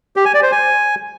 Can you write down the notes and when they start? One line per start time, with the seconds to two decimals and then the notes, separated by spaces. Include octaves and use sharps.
0.16 G4
0.25 G#5
0.34 D5
0.43 C5
0.52 G#5